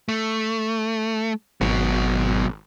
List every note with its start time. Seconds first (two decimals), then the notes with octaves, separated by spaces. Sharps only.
0.09 A3
1.61 G#1 B2 F#3